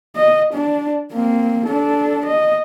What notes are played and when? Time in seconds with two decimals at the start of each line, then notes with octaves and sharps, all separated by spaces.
0.16 D#5
0.54 D4
1.13 A#3 C4
1.66 D4 A4
2.26 D#5